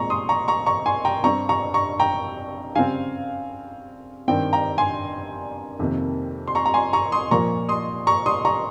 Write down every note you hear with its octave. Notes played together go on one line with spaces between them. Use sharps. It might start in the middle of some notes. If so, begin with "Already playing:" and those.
Already playing: A#2 G#3 C4 A#5 C#6
C6 D#6
A#5 C#6
A#5 C#6
A#5 C#6
G#5 C6
G5 A#5
G2 G3 C4 A#5 C#6
A#5 C#6
A#5 C#6
G5 A#5
C#3 G3 C4 F5 G#5
G2 D#3 G3 C4 G5
G5 A#5
G#5 C6
F2 C3 D#3 A#3
C6
A#5 C#6
A#5
G#5 C6
A#5 C#6
C6 D#6
A#2 F3 A#3 A#5 C#6
C6 D#6
A#5 C#6
C6 D#6
A#5 C#6